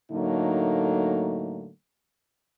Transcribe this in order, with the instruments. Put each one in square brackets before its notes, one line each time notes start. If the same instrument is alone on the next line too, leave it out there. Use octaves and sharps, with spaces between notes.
[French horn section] A2 D3 F#3 A3 A#3 D#4